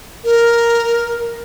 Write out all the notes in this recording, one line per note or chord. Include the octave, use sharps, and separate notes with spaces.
A#4